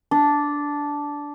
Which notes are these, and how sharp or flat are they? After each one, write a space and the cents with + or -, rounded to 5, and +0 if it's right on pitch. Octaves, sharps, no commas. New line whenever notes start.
D4 -10